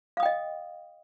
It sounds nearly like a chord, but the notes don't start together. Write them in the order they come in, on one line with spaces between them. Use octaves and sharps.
F5 D#6 G5 D#5